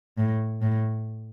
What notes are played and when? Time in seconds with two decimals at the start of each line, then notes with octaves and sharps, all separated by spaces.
0.18 A2
0.62 A2